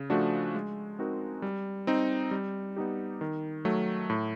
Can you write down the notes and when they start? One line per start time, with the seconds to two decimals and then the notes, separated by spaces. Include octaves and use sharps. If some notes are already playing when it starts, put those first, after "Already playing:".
Already playing: C#3
0.10 F3 A3 D4 F#4
0.55 G#3
0.99 C4 D#4 F#4 A#4
1.42 G3
1.87 C4 D#4
2.31 G3
2.76 B3 D#4 G4
3.21 D#3
3.65 F#3 A3
4.10 A2